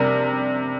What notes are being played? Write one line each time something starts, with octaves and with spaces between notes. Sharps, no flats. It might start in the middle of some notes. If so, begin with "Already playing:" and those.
Already playing: C3 G3 D4 A#4